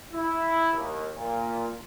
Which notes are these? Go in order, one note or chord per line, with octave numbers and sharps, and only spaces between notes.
E4
D#2
A#2